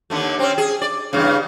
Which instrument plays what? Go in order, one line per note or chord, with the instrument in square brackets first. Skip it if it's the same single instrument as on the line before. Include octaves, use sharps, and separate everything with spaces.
[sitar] D#2 D3 A3
C4 C#4
G#4
D5
E2 G2 C#3